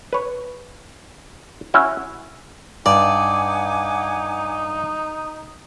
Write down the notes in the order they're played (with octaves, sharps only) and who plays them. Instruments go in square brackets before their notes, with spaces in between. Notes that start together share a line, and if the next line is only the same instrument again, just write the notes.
[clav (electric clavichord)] B4 C#5
C#4 E4 F#4
[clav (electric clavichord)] G2 [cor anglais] D#4 [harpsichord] D5 [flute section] F#5 G#5 D6